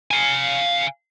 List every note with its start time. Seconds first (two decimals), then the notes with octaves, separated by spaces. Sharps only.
0.11 F5 G#5